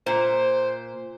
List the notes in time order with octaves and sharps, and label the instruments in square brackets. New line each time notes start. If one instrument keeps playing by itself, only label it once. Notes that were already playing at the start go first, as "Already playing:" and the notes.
[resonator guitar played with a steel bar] A#2 [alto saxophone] C5